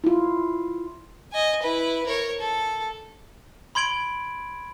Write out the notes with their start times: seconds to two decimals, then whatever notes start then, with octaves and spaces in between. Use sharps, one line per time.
0.04 E4 F4
1.32 D#5 G#5
1.62 E4 B4
2.06 A#4 C#5
2.40 A4
3.75 B5 C6 G#6 D7 F#7